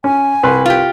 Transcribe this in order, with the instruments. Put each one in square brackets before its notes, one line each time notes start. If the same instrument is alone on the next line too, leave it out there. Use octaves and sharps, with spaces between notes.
[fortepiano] C#4 [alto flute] G#5
[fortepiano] C2 B4 C6
[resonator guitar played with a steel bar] F4 G4